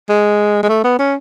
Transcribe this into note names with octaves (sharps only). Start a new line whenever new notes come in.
G#3
G#3
A3
B3
C#4